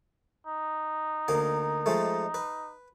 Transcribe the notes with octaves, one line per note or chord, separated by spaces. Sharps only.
D#4
D2 A#3 D#5
F3 G#3 A3
B4